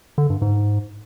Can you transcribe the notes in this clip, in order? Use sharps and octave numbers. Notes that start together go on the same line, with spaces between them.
D3
G2
G#2